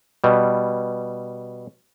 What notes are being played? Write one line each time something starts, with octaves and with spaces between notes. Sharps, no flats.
B2 G3